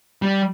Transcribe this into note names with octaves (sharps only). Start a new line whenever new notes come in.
G3